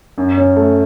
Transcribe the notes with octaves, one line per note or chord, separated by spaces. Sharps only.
F#2
C#4
A3